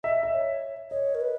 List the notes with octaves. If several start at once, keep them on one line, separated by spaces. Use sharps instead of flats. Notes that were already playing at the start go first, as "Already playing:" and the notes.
D#5 E5
E5
C#5
C#5 D#5
A#4
B4